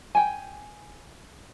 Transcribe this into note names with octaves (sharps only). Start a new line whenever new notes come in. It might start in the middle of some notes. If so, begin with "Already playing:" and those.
G5 G#5